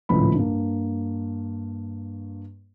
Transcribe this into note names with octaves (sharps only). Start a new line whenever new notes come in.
G#1 C#2 A2 F3 B4 B5
G2 A#3